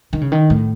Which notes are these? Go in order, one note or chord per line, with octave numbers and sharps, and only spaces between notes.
D#3
C#3
D#3
A2